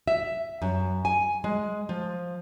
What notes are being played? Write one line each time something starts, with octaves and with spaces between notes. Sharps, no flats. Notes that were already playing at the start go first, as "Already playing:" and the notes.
E5
F#2
G#5
G#3
F3